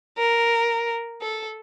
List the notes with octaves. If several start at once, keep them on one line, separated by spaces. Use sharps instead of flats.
A#4
A4